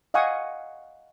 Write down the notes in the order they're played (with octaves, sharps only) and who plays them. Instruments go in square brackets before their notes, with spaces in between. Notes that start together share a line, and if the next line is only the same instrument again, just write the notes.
[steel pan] D#5 F5 F#5 G#5 C#6 D#6